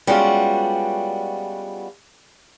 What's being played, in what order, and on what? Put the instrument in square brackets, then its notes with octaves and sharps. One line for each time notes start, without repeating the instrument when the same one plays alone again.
[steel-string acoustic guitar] G3 G#3 B3 C#4 F4 F#4